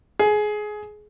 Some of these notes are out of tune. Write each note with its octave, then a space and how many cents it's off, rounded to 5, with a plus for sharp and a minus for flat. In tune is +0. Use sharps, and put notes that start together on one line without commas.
G#4 +20